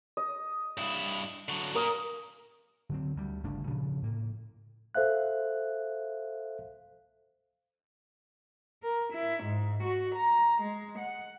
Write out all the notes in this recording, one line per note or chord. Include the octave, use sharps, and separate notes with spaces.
D#5
G2 E4
D3 F#3
A#2 A#3 A#4 D#6
D3 F#3 C4
D2 G3
G1 C#3 A3 D4
A#2 C#3 F3
A2 A#3
A4 C5 E5 F5 F#6
A#4
E4
G#2
F#4
A#5
G#3
F#5